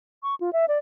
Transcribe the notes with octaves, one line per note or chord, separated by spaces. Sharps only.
C#6
F4
E5
D5